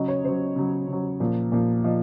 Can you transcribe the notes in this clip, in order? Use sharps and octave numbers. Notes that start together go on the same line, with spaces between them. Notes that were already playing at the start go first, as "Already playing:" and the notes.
Already playing: C#3 F#3 D#5
C#5
C#3 F#3 C5
C#3 F#3
C#3 F#3
A#2 F3
A#2 F3
F3 D#5